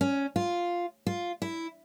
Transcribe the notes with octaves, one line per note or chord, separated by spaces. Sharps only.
C#4
F4
F4
E4